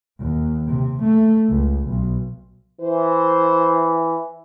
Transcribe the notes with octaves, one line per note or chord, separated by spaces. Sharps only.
D#2
C3
A3
C#2
B1
E3 C5